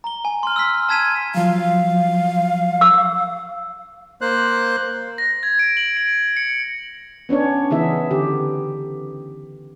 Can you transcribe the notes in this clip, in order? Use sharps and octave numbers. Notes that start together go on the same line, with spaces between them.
A#5 G7
G#5
C6 F6
E6 F6 B6
A5 E6 G#6 B6 D#7 E7
F3 F#3 F5
E6
A#3 C5 F#6
A#6
G#6
D7
F#7
D7
C#7
B3 C#4 D4 C#5
C#3 E3 B3 D#4 G#4 E5
D3 G4